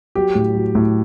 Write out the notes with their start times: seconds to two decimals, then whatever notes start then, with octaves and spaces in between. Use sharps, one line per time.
0.15 F#3 G4
0.35 A2
0.55 F#3
0.75 A2